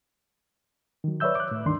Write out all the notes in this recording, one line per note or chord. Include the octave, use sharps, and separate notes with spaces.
D#3 F#3
B4 C#5 D5 E5 E6 G6
D6 F#6
A2
D2 G2 D#3 D4 C6